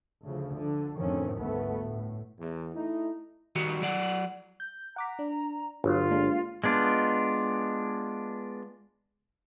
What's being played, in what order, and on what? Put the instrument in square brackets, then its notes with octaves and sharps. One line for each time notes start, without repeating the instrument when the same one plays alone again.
[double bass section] D2 C#3 F3
D3
F2 A2 D3 D#3 C4 C#4
G1 D2 G#2 A3 B3
A2
[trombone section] E2
[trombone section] A3 D#4 [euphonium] E4
[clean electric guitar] D#3 G3 F#4
F#3 D5 F#5
[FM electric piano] G6
[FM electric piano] F#5 D6 B6 [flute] A#5
[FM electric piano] D4
[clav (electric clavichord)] G1 [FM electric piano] D3 F#3 C#5 [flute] F4
[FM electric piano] G#3 A#3 D4
[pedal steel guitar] G#3 B3 D4 F4